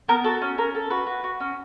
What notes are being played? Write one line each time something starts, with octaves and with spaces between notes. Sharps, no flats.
B3 A#4
F#4 A4
C#4
C#4 A#4
A4
F#4 B4
F#4
F#4
C#4